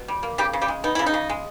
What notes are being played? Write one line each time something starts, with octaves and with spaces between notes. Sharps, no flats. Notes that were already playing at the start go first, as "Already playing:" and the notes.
Already playing: B2
G3
A#3
C#3 G3 G4
C#3
G3 G4
G#3
B3 D#4
C#3 E4
D#4
C#3
G#3